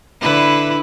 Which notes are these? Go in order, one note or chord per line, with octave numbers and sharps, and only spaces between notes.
D3 E4 B4